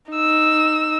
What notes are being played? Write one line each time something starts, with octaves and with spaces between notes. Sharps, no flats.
D#4 E6